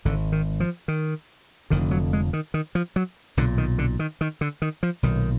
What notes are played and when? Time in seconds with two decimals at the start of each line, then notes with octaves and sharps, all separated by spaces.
0.05 G#1 G#2 D3
0.32 D#3
0.60 F3
0.88 D#3
1.70 F1 F2 D3 D#3
1.91 F#3
2.13 G#3
2.33 D#3
2.54 D#3
2.75 F3
2.96 F#3
3.37 B1 A#2 D3
3.58 D#3
3.78 D3
3.99 D#3
4.21 D#3
4.41 D3
4.62 D#3
4.83 F3
5.03 B1 A#2 D#3